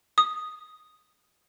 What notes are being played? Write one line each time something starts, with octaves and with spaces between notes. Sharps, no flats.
D#6